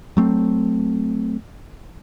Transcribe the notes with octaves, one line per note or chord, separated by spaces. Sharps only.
F#3 A3 C4